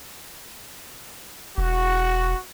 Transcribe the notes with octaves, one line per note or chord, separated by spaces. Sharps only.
E1 F#4